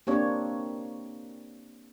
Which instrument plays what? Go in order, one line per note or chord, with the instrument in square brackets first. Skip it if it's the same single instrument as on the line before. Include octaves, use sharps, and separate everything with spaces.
[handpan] A#3 C4 D4 G4 C#5